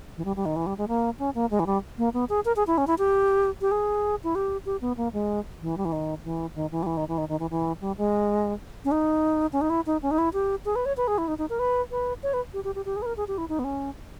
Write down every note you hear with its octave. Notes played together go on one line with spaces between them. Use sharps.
E3
G3
G3
D#3
E3
G3
G#3
A#3
C#4
A#3
G#3
E3
G3
A#3
B3
G#4
A#4
G#4
E4
C#4
E4
G4
G4
G#4
E4
G4
G4
B3
A#3
G#3
E3
G3
E3
D#3
E3
D#3
E3
G3
E3
D#3
E3
D#3
D#3
E3
E3
G3
G#3
C#4
D#4
C#4
D#4
E4
D#4
C#4
D#4
E4
G4
G#4
B4
C#5
B4
G#4
E4
D#4
D#4
A#4
B4
B4
C#5
B4
G4
G4
G4
G4
G#4
B4
A#4
G#4
G4
E4
D#4
B3
C#4